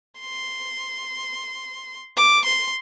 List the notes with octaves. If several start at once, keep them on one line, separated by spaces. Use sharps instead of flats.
C6
D6
C6